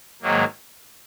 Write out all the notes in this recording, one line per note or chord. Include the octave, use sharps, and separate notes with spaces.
G#2 D#3 F#3 A#3